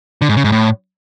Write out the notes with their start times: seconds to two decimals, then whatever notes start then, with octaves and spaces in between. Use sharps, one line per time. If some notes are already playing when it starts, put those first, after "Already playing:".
0.22 D3
0.29 G#2
0.37 C#3
0.44 G#2
0.52 A2